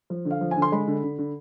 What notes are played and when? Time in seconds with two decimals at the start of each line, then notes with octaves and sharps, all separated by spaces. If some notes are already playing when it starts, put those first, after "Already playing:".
0.10 F3
0.25 D3
0.31 F5
0.41 F3
0.51 G#5
0.57 D3
0.62 C6
0.72 G#3 B5
0.88 D3
1.04 D3
1.19 D3